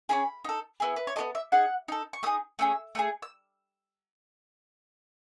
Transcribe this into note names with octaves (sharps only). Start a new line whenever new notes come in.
C#4 E4 G#4 B5
D#4 A4
B3 E4 G#4
B4
C#5
B3 F#4 A4 D#5
E5
D#4 G#4 F#5
D#4 A4
C#6
A3 D#4 G#4 D#6
A3 C#4 G#4 E6
A3 D#4 G#4
E6